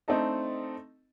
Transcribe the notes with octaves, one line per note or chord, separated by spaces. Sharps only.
A3 C4 D4 D#4 A4 D#5